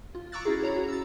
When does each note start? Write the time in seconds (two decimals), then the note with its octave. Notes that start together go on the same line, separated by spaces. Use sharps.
0.15 F4
0.32 A#5 C#6 D6 E6 F#6 A6
0.45 C#4 E4 F#4 G#4
0.62 G#4 C#5 A#5 B5
0.76 C#4 F#4
0.89 E6 A6